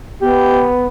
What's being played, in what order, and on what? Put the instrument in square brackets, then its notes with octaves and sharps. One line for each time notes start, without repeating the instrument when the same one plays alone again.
[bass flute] B3 [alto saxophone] G4